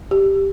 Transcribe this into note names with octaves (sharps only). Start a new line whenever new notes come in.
G4